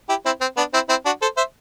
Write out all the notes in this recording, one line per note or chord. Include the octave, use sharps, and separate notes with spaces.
E4 G4
C4 E4
C4
B3 D4
C4 E4
C4 E4
D4 F#4
A4 C5
C5 E5